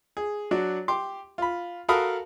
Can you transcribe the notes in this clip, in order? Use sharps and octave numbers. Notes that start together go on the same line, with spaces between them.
G#4
F#3 D4 F#4
G4 C6 D6
F4 B5
F#4 A4 A#4 F5 B5 D#6